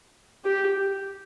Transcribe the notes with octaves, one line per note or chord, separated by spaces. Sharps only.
G4